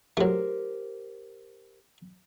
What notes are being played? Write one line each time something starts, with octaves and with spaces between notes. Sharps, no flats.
F#3 A3 G4 A#4 C5